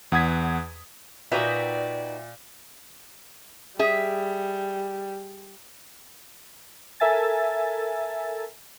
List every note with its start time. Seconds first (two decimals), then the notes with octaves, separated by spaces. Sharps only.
0.12 E2 F#5 D#6 G#6 B6
1.32 A#2 D#4 F#4 B4 D5 E5 G5 A#5
3.79 G3 G#4 E5
7.00 A4 A#4 E5 G#5 A6